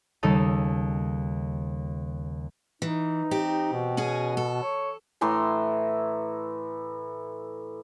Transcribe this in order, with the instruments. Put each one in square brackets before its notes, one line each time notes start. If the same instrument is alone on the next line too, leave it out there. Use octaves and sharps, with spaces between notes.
[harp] D#2 C#3 G3 D#4 A4 D#6
[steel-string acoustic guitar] E3 [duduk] D#4
[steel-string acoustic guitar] C4 G4
[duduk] B2
[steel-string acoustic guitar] C#4 F#4 G#4
A4
[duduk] C#5
[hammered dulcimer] A2 E3 A#5 C6